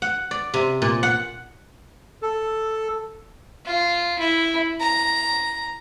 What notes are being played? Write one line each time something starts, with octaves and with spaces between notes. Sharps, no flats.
F#5
D5
C3
A#2
F#5
A4
F4
E4
A#5